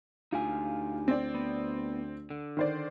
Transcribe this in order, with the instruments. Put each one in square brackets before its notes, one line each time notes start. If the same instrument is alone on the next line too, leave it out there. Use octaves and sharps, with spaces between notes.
[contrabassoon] D2 [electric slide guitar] D#4 G4 G#5 [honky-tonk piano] F4
[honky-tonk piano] C4 D5
[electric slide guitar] B3
D3
[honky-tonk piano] D#3 C5 D5